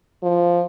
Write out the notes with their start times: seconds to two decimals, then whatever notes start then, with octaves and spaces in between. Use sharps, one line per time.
0.23 F3